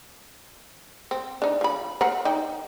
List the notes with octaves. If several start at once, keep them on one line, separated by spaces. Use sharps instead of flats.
C4
D4 D#4
F3 B5
A#4 C5 F#5
D#4 D5 G5